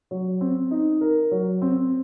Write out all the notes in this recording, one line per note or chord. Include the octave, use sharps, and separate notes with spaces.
F#3
C4
D#4
A#4
F#3
C4